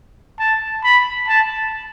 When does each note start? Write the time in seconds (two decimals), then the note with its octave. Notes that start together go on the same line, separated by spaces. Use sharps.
0.39 A5
0.84 B5
1.28 A5